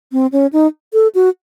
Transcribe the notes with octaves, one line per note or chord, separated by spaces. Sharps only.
C4
C#4
D#4
A4
F#4